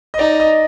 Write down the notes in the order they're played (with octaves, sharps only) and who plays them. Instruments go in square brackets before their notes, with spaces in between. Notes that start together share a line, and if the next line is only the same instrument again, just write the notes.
[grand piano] D#5
[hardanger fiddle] D#4 [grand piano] D5
[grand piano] D#5